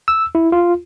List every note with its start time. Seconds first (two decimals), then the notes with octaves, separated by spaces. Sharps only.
0.08 E6
0.35 E4
0.52 F4